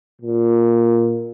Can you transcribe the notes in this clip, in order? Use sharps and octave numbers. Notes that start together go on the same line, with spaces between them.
A#2